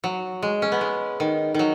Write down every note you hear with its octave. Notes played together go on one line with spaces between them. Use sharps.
F#3
G#3
C#4
B3
G#3
D#3
D#3 F#3